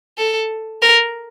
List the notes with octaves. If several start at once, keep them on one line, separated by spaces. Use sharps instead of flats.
A4
A#4